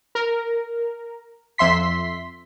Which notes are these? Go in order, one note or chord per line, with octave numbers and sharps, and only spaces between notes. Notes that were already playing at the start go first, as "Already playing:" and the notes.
A#4
F2 E5 C6 B6